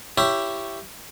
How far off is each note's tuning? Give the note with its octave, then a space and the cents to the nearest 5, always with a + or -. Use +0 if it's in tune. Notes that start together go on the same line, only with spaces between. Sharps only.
E4 +20 G4 +0 C#5 +0